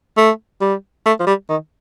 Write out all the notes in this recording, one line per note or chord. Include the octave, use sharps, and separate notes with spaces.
A3
G3
A3
F3
G3
D#3